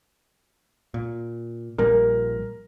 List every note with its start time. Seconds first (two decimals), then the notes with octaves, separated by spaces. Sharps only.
0.94 A#2
1.78 A#1 A#2 G3 A#4